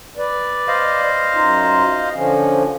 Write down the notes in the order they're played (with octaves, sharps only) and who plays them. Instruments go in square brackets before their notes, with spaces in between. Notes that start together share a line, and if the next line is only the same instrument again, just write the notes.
[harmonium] B4 D5
[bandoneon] C5 D#5 F5
[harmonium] F#2 D#4 F4
D3 F3 C#4